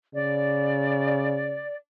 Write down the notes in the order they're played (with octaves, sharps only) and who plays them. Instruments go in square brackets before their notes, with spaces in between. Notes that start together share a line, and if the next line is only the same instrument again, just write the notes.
[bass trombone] C#3 [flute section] D5